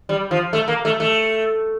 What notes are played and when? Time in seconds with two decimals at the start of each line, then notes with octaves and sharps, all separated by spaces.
0.09 G3
0.31 F3
0.53 A3
0.68 A#3
0.85 A3
1.00 A3